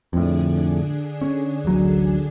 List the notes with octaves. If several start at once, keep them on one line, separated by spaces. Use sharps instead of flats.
F2 A2 D3 D4 G#4
C#4
D1 A1 F#3